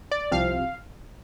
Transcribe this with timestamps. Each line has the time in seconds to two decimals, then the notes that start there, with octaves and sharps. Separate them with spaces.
0.12 D5
0.31 C2 C3 F3 C4 F5